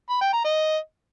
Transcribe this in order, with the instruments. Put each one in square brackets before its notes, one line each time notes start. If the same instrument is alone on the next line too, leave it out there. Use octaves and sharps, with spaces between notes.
[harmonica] B5
G5
A#5
D#5